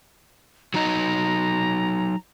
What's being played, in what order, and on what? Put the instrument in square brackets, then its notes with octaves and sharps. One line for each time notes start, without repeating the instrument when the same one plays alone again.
[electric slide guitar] F#3 D#4 D#5 [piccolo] A#5